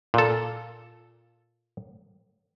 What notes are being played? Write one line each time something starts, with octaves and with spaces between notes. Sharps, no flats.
A#2 A4